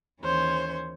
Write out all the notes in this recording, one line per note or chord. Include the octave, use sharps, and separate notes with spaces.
D#2 E3 C#4 C5 C#5 C6